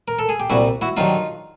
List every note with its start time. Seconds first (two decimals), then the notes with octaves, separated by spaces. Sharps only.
0.08 A#4
0.19 A4
0.29 G#4
0.40 G4
0.50 C2 A#2 G3 E4 F#4
0.82 E4 F#4
0.97 G2 D#3 F#3 D#4 F4